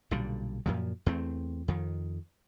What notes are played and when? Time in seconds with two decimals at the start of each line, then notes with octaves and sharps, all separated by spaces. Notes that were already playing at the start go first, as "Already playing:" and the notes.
0.11 B1 A#2 D3 G3
0.66 F#2 A#2 F3
1.06 E2 A3 C4
1.68 F2 D#3